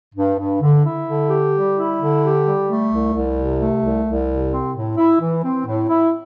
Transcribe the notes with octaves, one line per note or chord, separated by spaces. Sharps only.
G2
G2
D3
E4
D3
G4
G3
E4
D3
G4
G3
A3
C2
C2
C3
A3
C2
C2
C3
C4
A2
E4
E3
C4
A2
E4